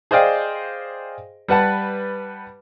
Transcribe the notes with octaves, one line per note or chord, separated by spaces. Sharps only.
G#4 C5 D5 D#5 F5 G5
G3 B4 F#5 A5